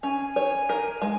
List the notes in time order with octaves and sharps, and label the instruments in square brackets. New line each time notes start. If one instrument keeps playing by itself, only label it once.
[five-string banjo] C#4 [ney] G#5
[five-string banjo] C#5
A#4
G#3